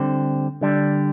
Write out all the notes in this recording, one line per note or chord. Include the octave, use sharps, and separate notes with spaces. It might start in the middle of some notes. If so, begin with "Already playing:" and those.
Already playing: D3 G3 C4
D3 G3 D4